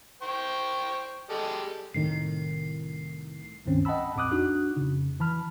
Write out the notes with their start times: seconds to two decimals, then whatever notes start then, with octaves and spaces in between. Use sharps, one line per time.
0.22 C5 G5 C#6
1.30 G3 G#3 A4
1.94 C2 A2 D#3 C7
3.66 C#2 G2 D#3 C4 C#4
3.85 D#5 F#5 G5 A5 B5 E6
4.16 A#1 F2 C4 D6 D#6 F#6
4.31 D4 D#4 F#4 F#6
4.76 F2 C#3
5.20 E3 A5 B5 F6